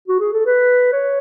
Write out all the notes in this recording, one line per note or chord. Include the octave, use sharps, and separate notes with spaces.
F#4
G#4
A4
B4
C#5